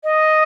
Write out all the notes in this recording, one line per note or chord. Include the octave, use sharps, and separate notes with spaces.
D#5